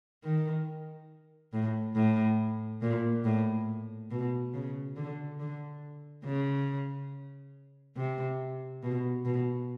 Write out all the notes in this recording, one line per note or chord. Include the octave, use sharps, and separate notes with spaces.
D#3
A2
A2
A#2
A2
B2
C#3
D3
D3
C#3
C3
B2
B2